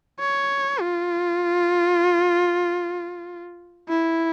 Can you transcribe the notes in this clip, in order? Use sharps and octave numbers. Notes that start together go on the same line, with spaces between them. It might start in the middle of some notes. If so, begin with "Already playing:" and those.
C#5
F4
E4